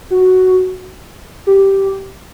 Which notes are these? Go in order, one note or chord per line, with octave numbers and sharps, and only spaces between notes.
F#4
G4